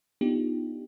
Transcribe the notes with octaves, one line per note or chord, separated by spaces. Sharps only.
B3 D4 D#4 F4 G4